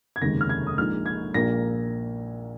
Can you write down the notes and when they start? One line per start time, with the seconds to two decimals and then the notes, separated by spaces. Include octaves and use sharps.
0.16 G#6
0.21 F1 D#2 C#3 G#3 D#4 A#6
0.41 F6
0.49 G#6
0.67 D#6
0.78 A#1 A#2 G#3 D#4 F6
1.06 G#6
1.34 A#1 A#2 A#3 A#6